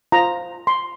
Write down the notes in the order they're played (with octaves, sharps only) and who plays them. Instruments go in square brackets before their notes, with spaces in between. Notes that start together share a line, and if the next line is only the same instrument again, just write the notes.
[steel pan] F4 C5 A#5
C6